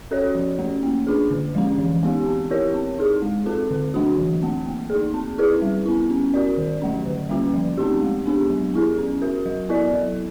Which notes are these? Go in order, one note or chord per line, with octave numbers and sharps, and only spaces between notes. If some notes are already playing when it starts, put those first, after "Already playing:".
C#4 F#4 A4 C#5
F3
A3 C#4
A#3
D4 F4 G#4
D3
F3 G#3 C#4
E3
G#3 B3 D#4 G4
C4
E4 G4 A#4 C#5
C4
D#4 G#4
G#3
C4 F4 A4
D3
F#3 A3 D4 F#4
E3
A3 C4
A#3
D#4 G#4
C4
E4 G#4 B4
G3
B3 E4
C#4
F#4 A#4 D5
D#3
F#3 A3 C#4
D3
G3 A#3 C#4 F4
F3
A3 C4 D#4 G4
G#3
B3 D4 G4
F#3
B3 E4 G#4
C#4
F#4 A#4
F#3
B3 E4 A4 D5
F#3